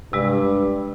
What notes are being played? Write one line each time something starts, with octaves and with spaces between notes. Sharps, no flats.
G2 C3 G#3